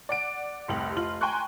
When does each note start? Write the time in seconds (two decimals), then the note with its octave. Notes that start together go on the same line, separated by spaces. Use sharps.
0.09 D5 F#5 D7
0.68 F1 C2 G4 F#7
0.96 F1 F4 F#7
1.21 G5 G#5 A#5 C6 C#6 F#6